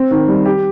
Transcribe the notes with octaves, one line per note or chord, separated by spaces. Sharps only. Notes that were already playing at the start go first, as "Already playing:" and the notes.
Already playing: C4
D#3
G3
G4